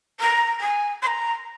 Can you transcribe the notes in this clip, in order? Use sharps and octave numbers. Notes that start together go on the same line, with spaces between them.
A#5
G#5
C6
A#5